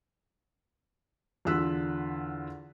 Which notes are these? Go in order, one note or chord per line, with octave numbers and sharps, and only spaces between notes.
E2 D3 F4 E6 F#6 B6